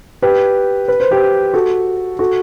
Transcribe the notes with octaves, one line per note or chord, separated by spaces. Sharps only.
G4 B4
B4
C5
G4 B4
F#4 A4
F#4 A4